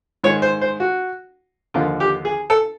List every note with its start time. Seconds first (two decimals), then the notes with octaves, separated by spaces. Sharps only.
0.23 G#2 D#3 G#3 C#5
0.42 C5
0.61 C5
0.80 F#4
1.74 D#2 D3 F3 A#3 F4
2.00 G4
2.25 G#4
2.50 A4